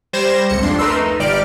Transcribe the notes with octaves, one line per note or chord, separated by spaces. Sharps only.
G3 C5 G#6 A#6 E7
G#1 C#2 C#7
F2 D4 C6
A3 A#4 B4 C6 E6
D#4
G1 G3 D5 F6 G6 D7